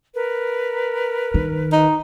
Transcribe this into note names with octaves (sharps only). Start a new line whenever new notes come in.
A#4 B4
D#3
D#4